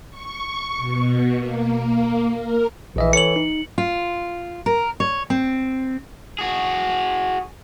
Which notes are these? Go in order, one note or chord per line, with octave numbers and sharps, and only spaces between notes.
C#6
B2
A#3
A#3
A#4
A#1 E3 D#5 E5
A4 C#5 C#7 F#7
D#4
F4
A#4
C#5
C4
F#4 G#4